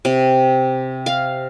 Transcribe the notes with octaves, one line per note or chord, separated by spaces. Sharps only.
C3
F5